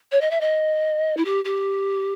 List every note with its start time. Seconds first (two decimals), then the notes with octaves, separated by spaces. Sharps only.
0.11 C#5
0.21 D#5
0.30 E5
0.40 D#5
1.17 E4
1.25 G4
1.44 G4